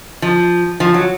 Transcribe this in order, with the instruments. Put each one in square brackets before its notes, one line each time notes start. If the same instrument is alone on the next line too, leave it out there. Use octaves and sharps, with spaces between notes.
[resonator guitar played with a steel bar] F3
F3
F#3